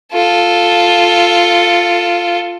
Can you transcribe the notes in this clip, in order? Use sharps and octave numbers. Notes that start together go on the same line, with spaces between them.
F4 A4